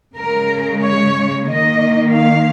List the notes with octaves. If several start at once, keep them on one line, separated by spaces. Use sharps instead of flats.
C#3 G#3 A#4
C#5
D#3 A#3 D#5
F5